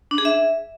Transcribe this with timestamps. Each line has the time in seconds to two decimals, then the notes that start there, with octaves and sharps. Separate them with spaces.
0.11 D4
0.18 G#4
0.25 E5